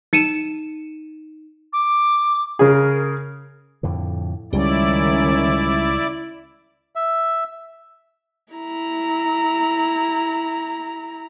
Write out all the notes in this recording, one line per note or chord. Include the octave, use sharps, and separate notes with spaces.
D#4 C#7 D#7 E7
D6
C#3 G#4 A#4
F2 A2 D3
C#2 D#3 G3 C#4 E4 D5
E5
E4 A#5